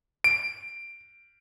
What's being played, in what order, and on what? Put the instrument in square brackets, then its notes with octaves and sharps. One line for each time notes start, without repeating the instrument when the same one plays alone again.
[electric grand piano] D7